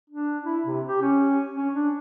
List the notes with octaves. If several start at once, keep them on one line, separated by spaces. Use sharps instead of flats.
D4
E4
C3
G4
C#4
C#4
D4